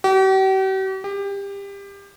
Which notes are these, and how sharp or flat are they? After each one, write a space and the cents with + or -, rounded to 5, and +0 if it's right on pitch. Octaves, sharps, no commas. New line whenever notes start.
G4 -45
G4 +25